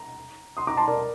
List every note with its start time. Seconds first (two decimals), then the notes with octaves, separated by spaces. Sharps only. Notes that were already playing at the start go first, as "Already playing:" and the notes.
Already playing: A#5
0.57 C6 D#6
0.67 A#5 D6
0.77 A5 C6
0.88 A#4 D5